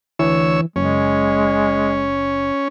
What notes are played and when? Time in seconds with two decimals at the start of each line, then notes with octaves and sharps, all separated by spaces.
0.19 D2 E3 C#5 E6
0.76 F#1 G#3 C#4